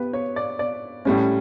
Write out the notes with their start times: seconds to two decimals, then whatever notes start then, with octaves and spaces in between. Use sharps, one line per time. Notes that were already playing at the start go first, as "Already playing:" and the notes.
Already playing: B3 G4 B4
0.13 C#5
0.36 D5
0.59 D5
1.05 A2 G3 C#4